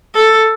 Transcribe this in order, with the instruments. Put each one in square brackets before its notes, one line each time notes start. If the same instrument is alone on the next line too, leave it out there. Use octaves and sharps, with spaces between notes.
[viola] A4